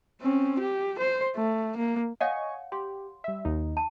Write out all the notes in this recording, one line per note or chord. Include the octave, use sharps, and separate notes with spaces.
C4 C#4
G4
C5
A3
A#3
C#5 D#5 F5 F#5 G#5 C#6
G4 C6
G3 E5
D#2 D#4
A5